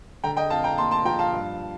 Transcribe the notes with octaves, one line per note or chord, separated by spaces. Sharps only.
D3 G5 A#5
D#5 G5
F2 F5 A5
G5 A#5
A#3 A5 C6
A5 C6
F3 G5 A#5
F5 A5
G2